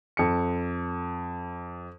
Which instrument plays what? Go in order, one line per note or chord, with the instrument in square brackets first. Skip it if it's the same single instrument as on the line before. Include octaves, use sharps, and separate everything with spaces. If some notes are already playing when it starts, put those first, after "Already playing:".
[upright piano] F2 C#7